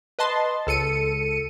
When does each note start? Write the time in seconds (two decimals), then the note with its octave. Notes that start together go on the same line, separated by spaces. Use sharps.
0.19 B4 D#5 A5 C6
0.67 C#2 A4 C#7 D#7